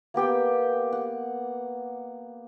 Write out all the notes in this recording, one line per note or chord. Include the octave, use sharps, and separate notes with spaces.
A#3 B3 G4 G5
F#5